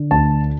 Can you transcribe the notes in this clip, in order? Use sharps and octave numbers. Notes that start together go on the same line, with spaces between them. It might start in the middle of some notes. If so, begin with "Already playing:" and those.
Already playing: D3
D2 A5